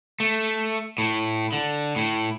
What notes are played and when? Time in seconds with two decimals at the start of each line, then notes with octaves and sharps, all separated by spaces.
0.20 A3
0.98 A2
1.52 D3
1.96 A2